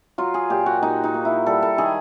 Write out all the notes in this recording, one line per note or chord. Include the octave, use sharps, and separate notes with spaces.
F#3 F4
G#4
A#2 G4
F#4
A#2 D#4
D#4
A#3
E4
G3 A4
A4
D#3 G#4